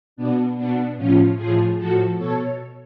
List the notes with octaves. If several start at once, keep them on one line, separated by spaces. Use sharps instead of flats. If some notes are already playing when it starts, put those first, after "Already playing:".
B2 B3 D4
B2 B3 D4
A2 F3 C#4 F4
A2 F3 F4 G#4
A2 F3 F#4 A4
B2 A4 C#5